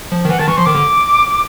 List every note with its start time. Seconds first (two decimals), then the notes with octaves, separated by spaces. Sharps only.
0.12 F3
0.25 D#3
0.29 E3 F#5
0.39 D#3 A5
0.48 E3 C#6
0.57 F3 C6
0.66 D#3 D6
0.75 D3